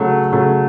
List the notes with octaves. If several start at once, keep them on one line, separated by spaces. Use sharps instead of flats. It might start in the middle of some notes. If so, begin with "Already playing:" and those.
Already playing: C#3 F#3 A3
C#3 F#3 A3